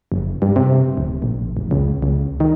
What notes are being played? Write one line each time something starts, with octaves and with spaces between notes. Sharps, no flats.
F#1
G2
C3
D1
A#1
F1
C#2
C#2
D#3